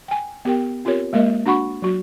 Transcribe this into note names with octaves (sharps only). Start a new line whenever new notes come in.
G5 G#5
B3 G4 A#4 G5
C4 F4 G4 A#4 C#5
G#3 A#3 A#4 D#5 E5
D4 F#4 F#5 B5 C#6
F#3 F#4